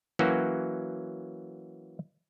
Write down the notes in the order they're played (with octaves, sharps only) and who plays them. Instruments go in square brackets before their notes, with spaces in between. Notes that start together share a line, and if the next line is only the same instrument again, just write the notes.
[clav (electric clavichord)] E3 F#3 A#3 C#4 F#4